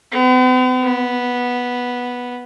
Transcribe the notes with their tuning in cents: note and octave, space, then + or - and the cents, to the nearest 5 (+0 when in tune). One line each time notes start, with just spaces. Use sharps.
B3 +45
B3 -5